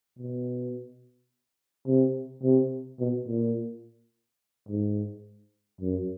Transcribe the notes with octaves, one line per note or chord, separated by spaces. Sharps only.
B2
C3
C3
B2
A#2
G#2
F#2